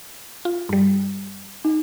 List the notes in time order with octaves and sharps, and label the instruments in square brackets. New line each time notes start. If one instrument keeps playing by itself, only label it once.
[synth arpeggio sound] F4
G2 G3
[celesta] D#4